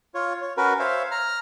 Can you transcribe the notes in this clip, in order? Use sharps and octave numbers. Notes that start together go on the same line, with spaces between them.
F4 C#5
C#5
C#4 F#4 A#4 B4
C5 C#5 E5 F5
A#5 F6